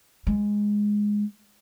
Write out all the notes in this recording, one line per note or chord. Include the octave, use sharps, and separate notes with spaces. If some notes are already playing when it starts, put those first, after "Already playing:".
G#3